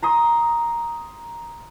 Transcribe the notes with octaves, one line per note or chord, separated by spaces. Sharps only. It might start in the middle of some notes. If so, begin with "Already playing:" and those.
A#5 C6 D#6